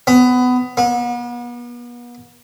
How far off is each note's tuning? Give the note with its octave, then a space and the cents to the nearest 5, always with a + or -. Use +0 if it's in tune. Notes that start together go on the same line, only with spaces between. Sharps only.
B3 +20
B3 -40